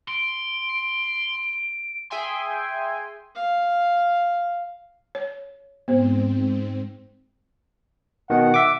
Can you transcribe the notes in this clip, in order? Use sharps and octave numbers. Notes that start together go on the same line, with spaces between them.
C6 D7
G#4 E5 G5 G#5 C6
F5
C#5
G#2 B3 C4 C5
B2 D#3 F#5
E5 D6